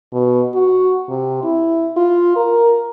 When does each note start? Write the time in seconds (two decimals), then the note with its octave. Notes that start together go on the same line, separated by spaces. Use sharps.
0.13 B2
0.54 F#4
1.08 C3
1.43 E4
1.97 F4
2.36 A#4